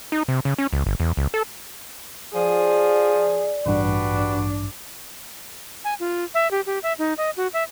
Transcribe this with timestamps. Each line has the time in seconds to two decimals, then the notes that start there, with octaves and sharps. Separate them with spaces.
0.12 D#4
0.28 C3
0.45 C#3
0.58 C#4
0.73 C#2
0.86 G1
1.00 E2
1.17 C#2
1.34 A4
2.34 F3 G#4 D5
3.66 A1 G2 G3 D4 F#4 B4
5.84 G#5
6.00 F4
6.34 E5
6.51 G4
6.66 G4
6.83 E5
6.99 D#4
7.18 D#5
7.37 F#4
7.53 E5